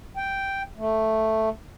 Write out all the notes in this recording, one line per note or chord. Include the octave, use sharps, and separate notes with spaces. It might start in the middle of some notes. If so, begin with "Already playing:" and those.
G5
A3